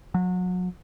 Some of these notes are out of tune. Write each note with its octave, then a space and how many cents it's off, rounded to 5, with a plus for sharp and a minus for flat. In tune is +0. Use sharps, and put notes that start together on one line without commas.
F#3 -30